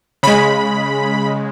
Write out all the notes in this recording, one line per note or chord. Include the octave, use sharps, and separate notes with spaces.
C#3 G#3 B5